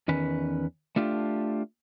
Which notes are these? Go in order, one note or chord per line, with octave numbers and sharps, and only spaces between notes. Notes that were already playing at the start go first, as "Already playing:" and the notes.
E2 D#3 C#4 B4
A3 D4 F4 G4